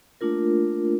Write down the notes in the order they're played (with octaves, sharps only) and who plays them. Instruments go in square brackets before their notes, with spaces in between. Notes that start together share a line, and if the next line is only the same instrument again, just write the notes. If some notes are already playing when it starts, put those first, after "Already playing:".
[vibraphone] A3 A#3 D4 F4 A#4